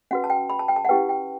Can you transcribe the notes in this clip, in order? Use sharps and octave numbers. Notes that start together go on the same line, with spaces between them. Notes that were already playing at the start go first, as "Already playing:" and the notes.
C#4 F#4 B4 F#5
A5
G5
B5
A5
G5
A5
F#5
C#4 E4 G4 B4 G5
G5